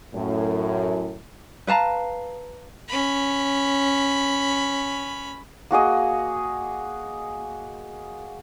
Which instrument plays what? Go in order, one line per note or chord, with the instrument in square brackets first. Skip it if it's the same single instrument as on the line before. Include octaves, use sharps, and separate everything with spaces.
[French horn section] F#2 A2
[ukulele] B4 F5 A5 A#5
[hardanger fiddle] C#4 B5
[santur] A#3 F#4 G#4 D#5